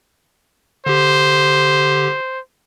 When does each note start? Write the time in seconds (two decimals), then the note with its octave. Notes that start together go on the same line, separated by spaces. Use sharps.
0.86 D3 G4 C5